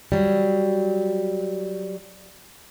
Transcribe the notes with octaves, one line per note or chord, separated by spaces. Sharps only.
F#3 G3